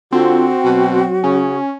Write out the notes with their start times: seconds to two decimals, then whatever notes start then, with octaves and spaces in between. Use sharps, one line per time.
0.12 D3 C4 F4 F#4
0.64 B2 F#3
1.24 C#3 C#4